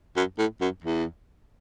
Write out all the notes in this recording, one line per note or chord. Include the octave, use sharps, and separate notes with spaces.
F#2
A2
F#2
E2